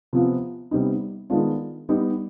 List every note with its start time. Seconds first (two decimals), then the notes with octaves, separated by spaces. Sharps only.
0.13 C3 F3 B3 F4
0.71 C3 G3 B3 D#4
1.30 D#3 G#3 B3 D4 F4
1.89 G3 B3 D#4 G4